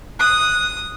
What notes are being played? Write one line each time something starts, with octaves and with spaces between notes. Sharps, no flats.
D#6 F#6